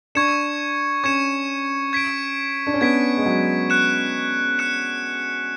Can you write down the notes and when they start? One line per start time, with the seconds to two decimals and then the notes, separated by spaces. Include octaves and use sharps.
0.15 D4 C#6 G#6 C#7 E7
1.04 C#4 C#6 G#6 C#7 E7
1.93 G#6 B6 D7
2.67 D4
2.74 C#4
2.81 B3 G#6 B6 D7
3.17 G#3
3.26 F#3
3.70 F#6 C#7 E7
4.59 F#6 C#7 E7